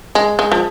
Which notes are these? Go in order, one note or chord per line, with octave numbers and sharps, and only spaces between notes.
G#3
G#3
F3